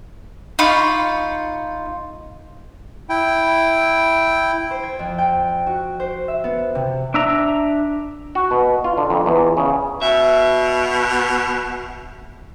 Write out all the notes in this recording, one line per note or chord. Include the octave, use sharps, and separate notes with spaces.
D#4 F4 B5 C#6
E4 G5
C5
G#6
F2
G5
F#4
C5
E5
B3
C3
D4 E5 A#5
F#4
B2
F4
D3
F2
E2
C#3
B2 E5